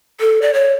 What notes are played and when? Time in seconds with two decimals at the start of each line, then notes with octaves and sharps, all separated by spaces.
0.20 A4
0.42 D5
0.54 C#5